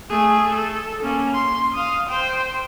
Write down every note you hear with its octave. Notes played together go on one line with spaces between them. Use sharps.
A3 G#4
A4
A#3 C#4
C6
F5 D#6
C5 G5